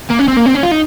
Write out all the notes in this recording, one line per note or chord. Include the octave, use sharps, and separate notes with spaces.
A#3
C#4
C4
A#3
C4
C#4
F4
D#4